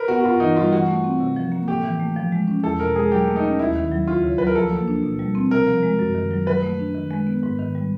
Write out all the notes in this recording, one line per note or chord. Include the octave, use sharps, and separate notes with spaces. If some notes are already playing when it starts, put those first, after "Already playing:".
Already playing: A#4 B4
B3 F#4
F#4
G2 F4
E3 D#4
G3 F4
E3 F#4
A3
C4
C3
F3
A#3
A2 G4
E3
A3
F3
G#3
C#4
E2 A4
B2 A#4
G#3 G#4
F#3 G4
A3
D#4
C#4
D#2 E4
D#3
F#3
D2 F4
C#3
F#3 B4
A#4
F3 A4
A#3
D4
B2
G3
C4
C3 A#4
F3
G#3
F#2
D#3
F#3
F#3 B4
A3
D4
D#3
G#3
B3
G#2
D#3
G3